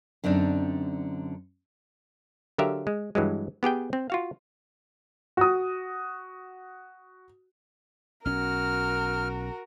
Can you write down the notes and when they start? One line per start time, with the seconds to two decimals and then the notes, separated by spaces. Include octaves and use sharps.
0.24 F#2 D3 C4 D4 D#4
2.58 D3 F#3 G4 A#4 E5 F5
2.87 G#3
3.15 G2 E3 F#3 G#3
3.63 B3 G4 G#4 G5
3.93 C4
4.10 F4 F#4 F5
5.37 F#4 D#6
8.25 B1 C#4 F#4 A#4 F6